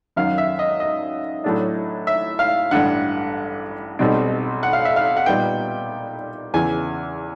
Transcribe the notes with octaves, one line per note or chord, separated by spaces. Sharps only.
F#2 D#3 F#3 F5
E5
D#5
D#5
A2 F#3 A3 D4
E5
F5
A1 G2 D3 F#5
B1 B2 G3 C4 D#4
F#5
F5
E5
F5
F#5
A#2 G3 B3 D#4 G5
E2 C#3 E3 G#5